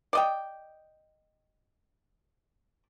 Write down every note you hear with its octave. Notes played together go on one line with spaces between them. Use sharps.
D5 D#5 G5